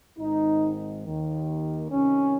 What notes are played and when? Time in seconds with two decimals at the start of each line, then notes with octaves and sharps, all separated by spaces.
0.19 G#1 G#2 D#3 D#4
1.04 D#2 D#3
1.91 C2 C3 D#3 C#4